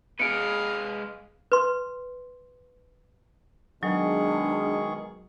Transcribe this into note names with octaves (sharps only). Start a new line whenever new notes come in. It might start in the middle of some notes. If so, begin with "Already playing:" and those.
G#3 G#4 B4 F5 C#7 D7
B4 C6
B2 D#3 F#3 G#3 D4 G#4 C#6